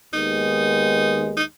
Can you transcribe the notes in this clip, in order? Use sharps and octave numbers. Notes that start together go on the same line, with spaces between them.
D#2 D#3 G#3 B3 D#4
D#4